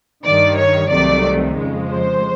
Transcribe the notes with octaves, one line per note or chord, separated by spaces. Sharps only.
G2 D#3 G3 D5
C#5
C2 C3 D#3 F#3 A3 D5
F2 C#3 F3 G#3
C5